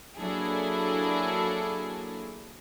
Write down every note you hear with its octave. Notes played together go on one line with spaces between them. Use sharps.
F#3 A#3 D4 E4 G#4 A4